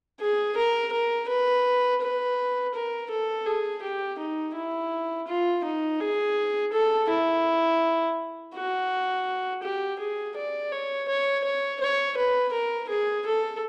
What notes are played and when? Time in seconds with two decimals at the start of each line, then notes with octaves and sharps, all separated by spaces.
0.20 G#4
0.57 A#4
0.92 A#4
1.29 B4
2.01 B4
2.74 A#4
3.10 A4
3.46 G#4
3.82 G4
4.19 D#4
4.55 E4
5.27 F4
5.64 D#4
6.00 G#4
6.73 A4
7.09 E4
8.55 F#4
9.63 G4
9.99 G#4
10.36 D5
10.72 C#5
11.08 C#5
11.44 C#5
11.81 C#5
12.17 B4
12.53 A#4
12.89 G#4
13.26 A4